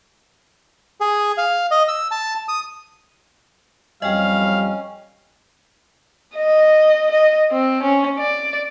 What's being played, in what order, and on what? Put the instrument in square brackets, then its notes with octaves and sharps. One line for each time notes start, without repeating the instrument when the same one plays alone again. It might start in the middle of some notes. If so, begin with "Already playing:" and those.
[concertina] G#4
F5
D#5
E6
A5
D#6
[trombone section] F2 F#3 G3 [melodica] C#4 [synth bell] D#5 G5 [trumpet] F5
[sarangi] D#5
D#5
C4
C#4
D5